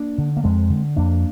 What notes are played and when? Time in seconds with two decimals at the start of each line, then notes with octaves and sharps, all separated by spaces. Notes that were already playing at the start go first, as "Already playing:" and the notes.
Already playing: A#3 D4
0.18 D3
0.37 A#3
0.44 F2 G#3 C4
0.70 D3
0.97 F2 A#3 D4